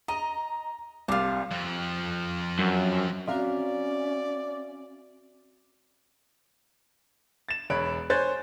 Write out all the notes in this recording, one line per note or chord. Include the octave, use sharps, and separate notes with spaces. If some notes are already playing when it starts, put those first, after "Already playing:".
D#5 A#5
C2 D4 F4
F2 F3
F#2
C4 C#4 F#4 D5 E5 F5 A#5
A6 E7
E1 C#5 B5 F#6 D7
C5 C#5 G#5 F#6 G6 A6